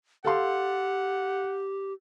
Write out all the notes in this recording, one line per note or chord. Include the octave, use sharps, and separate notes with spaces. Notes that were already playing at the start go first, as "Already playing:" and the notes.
G4 A4 F5 F#5 C6